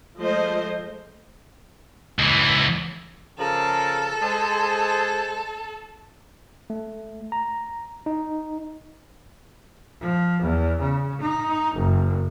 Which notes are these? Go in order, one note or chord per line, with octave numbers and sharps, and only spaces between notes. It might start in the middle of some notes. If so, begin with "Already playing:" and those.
F3 G#3 A3 C5 D#5
C#2 E3
C#3 F3 A4 A#4
G#3 G#4 C5
A3
A#5
D#4
F3
E2
C#3
D#4
F#1